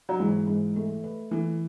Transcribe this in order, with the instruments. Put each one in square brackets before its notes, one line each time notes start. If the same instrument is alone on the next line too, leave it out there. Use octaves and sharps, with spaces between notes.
[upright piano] F#3
[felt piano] G#2 [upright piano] E3
[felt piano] G#2
A3
B4
[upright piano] E3 [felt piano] A3